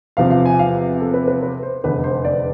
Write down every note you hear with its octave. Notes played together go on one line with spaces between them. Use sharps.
E2 C3 F3 F5
F5
G#5
F5
A4
B4
B4
B4
C5
F1 E2 D3 B4
C5
D5